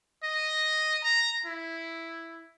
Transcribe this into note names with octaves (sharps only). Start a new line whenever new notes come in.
D#5
A#5
E4